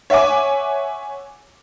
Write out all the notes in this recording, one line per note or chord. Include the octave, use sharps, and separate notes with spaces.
C#5 E5 F#5 G#5 D6